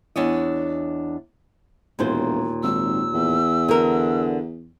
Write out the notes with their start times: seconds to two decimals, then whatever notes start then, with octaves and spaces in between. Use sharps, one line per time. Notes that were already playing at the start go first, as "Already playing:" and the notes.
0.16 E2 D4 C#5 D#5
1.99 E1 D#2 A#2 C5
2.63 G#1 E6
3.14 E2
3.68 D3 F#4 A#4